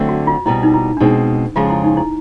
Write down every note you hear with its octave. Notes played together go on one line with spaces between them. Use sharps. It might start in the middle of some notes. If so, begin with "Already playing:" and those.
Already playing: D3 F#3 A3 C4
F#4
F4
B2 G3 C4 E4
D#4
E4
D4
B2 G#3 C4 D#4
F2 C#3 F3 G#3 F4
E4
D#4
E4